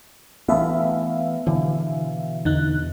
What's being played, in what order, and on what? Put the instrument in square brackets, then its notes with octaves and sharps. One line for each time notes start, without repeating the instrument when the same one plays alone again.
[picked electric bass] E3 A3 B3 [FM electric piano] E5 F5
[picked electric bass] B2 E3 [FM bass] D3
[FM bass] E2 [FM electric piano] D3 D#4 F#6